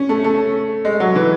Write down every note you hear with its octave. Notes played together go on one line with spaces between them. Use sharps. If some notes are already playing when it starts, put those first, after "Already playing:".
Already playing: C#4
A3
A3
G#3
F#3
E3